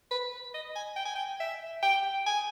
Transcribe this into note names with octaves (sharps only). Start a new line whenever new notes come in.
B4
D#5
G#5
G5
G#5
G5
E5
G5
G#5